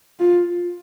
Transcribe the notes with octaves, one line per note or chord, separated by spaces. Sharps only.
F4